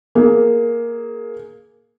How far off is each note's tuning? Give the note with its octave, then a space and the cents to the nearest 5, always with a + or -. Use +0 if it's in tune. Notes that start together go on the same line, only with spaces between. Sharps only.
A#3 +5 G#4 +15